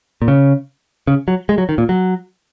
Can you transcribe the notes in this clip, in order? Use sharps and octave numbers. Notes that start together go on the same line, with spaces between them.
A#2
C#3
C#3
F#3
G#3
F#3
D#3
A#2
F#3